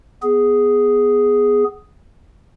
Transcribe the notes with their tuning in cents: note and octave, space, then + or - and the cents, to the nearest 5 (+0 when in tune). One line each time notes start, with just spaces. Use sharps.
B3 +0 G#4 +0